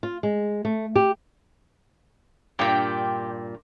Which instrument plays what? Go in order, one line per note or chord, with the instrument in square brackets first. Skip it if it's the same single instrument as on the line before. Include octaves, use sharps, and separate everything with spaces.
[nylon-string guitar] F4
G#3
A3
G4
[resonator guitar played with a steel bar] G2 A#2 [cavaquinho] G4 [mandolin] D5 G5